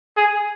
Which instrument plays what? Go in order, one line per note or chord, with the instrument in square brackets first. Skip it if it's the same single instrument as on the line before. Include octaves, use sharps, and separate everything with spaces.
[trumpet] G#4